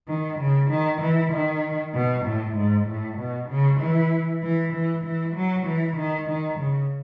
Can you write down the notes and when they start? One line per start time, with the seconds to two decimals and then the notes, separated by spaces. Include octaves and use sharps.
0.08 D#3
0.39 C#3
0.70 D#3
1.01 E3
1.32 D#3
1.94 B2
2.25 A2
2.56 G#2
2.87 A2
3.18 B2
3.49 C#3
3.80 E3
4.42 E3
4.73 E3
5.04 E3
5.35 F#3
5.66 E3
5.97 D#3
6.28 D#3
6.59 C#3